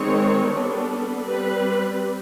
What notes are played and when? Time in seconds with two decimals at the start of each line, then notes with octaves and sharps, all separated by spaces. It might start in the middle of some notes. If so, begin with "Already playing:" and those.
Already playing: D#3 G#3 C4 C#5
0.46 G3 B3 D4 A4
1.25 G3 C4 B4